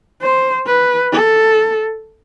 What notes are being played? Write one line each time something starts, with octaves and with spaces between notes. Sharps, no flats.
C5
B4
A4